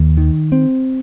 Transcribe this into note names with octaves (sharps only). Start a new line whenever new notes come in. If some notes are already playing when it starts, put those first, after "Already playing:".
Already playing: D#2
D#3
C4